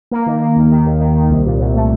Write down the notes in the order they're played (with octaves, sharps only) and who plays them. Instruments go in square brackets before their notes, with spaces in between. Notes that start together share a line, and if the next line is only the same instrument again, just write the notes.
[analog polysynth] A#3
D#3
A#3
D#2
D#3
D#2
D#3
D#3
C2
A#2
C2
A3